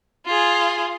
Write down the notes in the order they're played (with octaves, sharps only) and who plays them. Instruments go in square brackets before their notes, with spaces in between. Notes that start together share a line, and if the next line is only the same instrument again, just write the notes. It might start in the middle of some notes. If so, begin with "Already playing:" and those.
[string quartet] F4 G#4